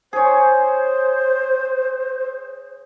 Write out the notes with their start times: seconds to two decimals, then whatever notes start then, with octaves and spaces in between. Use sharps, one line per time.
0.13 G#4 C5 C#5